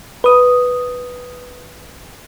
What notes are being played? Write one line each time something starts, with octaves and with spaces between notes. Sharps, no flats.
B4 D#6